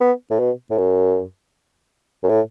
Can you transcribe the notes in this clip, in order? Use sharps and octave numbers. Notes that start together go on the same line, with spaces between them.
B3
A2
B2
A2
F#2
F#2
A2